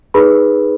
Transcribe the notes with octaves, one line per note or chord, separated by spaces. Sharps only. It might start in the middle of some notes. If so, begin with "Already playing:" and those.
D#4 G#4 B4 B5